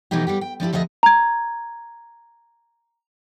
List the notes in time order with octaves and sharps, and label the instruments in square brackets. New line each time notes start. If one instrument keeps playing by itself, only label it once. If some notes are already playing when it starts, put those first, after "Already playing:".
[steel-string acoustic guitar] B2 E3 F3 A3 D#4 G4
G3 B3 G4
G5
F3 D4 E4 G4
D2 F3 B3 D#5 E5
[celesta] A#5 G#6